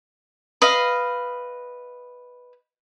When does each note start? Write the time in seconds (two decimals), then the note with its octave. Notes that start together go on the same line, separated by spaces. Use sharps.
0.62 B4 D#5 F5